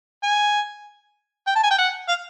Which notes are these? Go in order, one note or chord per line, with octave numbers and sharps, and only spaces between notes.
G#5
G5
A5
G#5
G5
F#5
F5